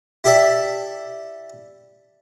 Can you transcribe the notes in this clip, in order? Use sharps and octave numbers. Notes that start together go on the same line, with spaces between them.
E4 G4 A4 D5 E5